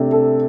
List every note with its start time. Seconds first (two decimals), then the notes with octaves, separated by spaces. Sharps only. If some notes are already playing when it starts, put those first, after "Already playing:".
Already playing: C3 A3 D4
0.12 A4